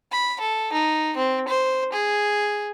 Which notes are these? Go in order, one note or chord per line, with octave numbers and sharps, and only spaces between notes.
B5
A4
D#4
C4
C5
G#4